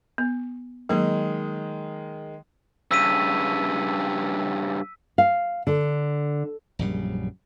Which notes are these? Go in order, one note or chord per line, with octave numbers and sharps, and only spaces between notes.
B3
D#3 F#3 G#3 A#3
G2 C#3 E6 B6 D#7
F5
D3
A#1 F#2 C#3 G3